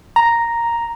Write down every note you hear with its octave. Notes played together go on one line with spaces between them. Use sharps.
A#5